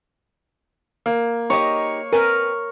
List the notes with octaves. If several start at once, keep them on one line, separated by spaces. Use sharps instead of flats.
A#3
D#4 G4 C#5 D#5
C4 A#4 B4 G#5